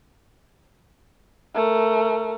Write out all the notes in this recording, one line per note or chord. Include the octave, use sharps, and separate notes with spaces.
A3 A#4